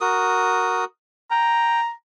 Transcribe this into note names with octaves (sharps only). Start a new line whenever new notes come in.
F#4 A#4 D#6
G5 A#5